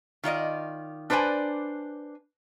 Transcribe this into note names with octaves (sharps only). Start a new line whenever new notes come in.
D#3 F4 D5 D#5
D4 B4 C5 D5 G#5